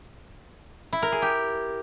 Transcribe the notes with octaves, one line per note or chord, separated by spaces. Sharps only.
E4
A#4
G#4
G4